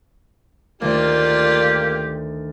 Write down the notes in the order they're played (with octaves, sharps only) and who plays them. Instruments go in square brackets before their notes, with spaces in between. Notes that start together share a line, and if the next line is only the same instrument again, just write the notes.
[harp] D2 D#3 [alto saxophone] A#3 [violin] F4 D5 [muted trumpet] G4